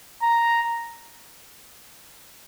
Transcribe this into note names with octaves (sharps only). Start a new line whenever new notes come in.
A#5